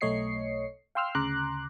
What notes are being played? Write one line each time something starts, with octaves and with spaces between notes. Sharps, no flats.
B1 A3 C#5 D#5 C7 C#7
F5 G5 C6 E6 F6
D2 C#3 A#5 C6 D6 F#6